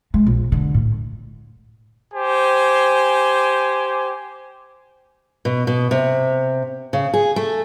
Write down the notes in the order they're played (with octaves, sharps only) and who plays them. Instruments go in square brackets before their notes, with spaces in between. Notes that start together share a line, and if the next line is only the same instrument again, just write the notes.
[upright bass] G#3
A#1
D3
A2
[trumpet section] G4 C5 G#5
[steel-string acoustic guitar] B2
B2
C3
C#3
G#4
A3